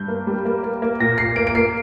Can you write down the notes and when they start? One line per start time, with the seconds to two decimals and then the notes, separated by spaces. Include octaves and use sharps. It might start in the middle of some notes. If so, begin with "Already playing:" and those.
Already playing: G2 G6
0.08 A#3
0.27 G3
0.45 A#3
0.63 A#3
0.82 A#3
1.00 A#2 A#6
1.18 A#2 C7
1.36 A#3 D7
1.47 D7
1.55 A#3 C7